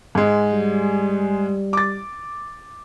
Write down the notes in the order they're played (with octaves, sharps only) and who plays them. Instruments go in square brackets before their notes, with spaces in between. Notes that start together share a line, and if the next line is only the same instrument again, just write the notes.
[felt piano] G#2 G#3
[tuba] G3
[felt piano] D6 A6